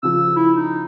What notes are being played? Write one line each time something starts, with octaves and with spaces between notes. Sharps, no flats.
C#3 F3 E6
E4
D#4